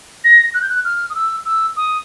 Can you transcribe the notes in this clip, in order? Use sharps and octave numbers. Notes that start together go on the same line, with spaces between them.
A#6
F#6
G6
F#6
F6
D#6
E6
E6
D#6